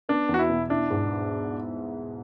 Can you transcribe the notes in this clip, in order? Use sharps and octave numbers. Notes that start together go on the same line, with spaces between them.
B3 D4
E2
F#4
E4
B2
D4 E4
G#2